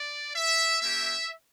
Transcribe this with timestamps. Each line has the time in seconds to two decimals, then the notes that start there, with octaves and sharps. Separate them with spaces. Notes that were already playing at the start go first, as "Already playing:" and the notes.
Already playing: D5
0.36 E5
0.82 A#3 C#4 G4 E5